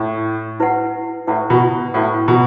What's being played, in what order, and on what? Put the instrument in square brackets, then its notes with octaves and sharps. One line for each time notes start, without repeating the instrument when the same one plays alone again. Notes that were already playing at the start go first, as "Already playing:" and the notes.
Already playing: [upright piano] A2
[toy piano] E4 B4 F#5
[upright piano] A2 [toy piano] E4 B4 F#5
[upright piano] B2
[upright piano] A2 [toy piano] E4 B4 F#5
[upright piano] B2